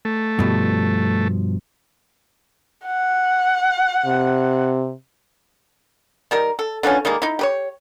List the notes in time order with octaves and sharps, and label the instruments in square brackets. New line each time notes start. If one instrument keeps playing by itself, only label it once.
[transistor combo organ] A3
[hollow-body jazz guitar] G2 B2 F3
[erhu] F#5
[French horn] C3
[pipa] D#3 G3 A#4
A4
D3 E3 F3 C#4
D#3 G3 G#3 A#3
D#4 E4
G4 B4 C#5